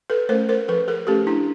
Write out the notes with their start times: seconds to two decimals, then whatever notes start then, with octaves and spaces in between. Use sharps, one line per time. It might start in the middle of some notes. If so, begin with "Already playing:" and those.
0.10 A4 B4
0.29 A3 C#4 A#4 C5
0.49 A#4 C5
0.68 F3 A4 B4
0.88 G#4 A#4
1.07 A3 C#4 G4 A4
1.27 D4 E4